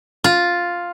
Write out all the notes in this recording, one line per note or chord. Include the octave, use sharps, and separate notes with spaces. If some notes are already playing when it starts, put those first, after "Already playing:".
F4